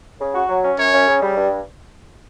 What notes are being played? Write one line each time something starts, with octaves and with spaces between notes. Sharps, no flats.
C#3
F#4
F#3
C#4
F#2 C#5
C#4
C#3
G3
G2